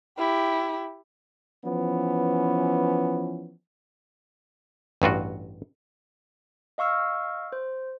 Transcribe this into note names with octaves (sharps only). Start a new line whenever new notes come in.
E4 G4
E3 F3 B3 C#4
A1 G2 F4 F#4
D#5 F5 C#6 E6 F6
C5